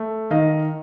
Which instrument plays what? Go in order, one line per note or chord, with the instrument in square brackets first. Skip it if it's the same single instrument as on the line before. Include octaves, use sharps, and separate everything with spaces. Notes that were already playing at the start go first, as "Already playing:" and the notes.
Already playing: [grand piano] A3
D#3 D#5 F5